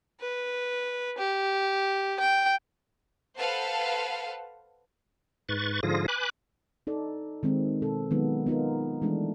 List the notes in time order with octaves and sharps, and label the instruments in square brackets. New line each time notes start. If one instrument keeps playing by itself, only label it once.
[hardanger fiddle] B4
G4
G5
[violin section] A4 B4 C5 F5 F#5 A5
[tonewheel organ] G#2 B4 C#6 A6
G#2 D3 F3 F4 G#4 A#6
B4 G#5 B5 D6 F#6
[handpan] D#4 A4 D5
D#3 G#3 C4
B2 A4
D#3 F#3 G#3 B3 D#4 F4
B3 D#4 F4 A#4
E3 G#3 A3 D4